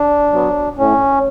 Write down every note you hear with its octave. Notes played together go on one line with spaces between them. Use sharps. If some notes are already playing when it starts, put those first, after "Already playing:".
Already playing: D4
F#3 B3
A2 C#4